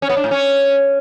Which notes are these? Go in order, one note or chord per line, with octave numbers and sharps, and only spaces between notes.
C#4
B3
D4
A2
C#4